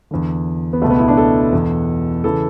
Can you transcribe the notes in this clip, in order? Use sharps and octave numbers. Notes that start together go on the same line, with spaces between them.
E2 D3
B3
C#2 B2 A3
B3
E4
D4
A4
E2 B2
C#3 E3 A4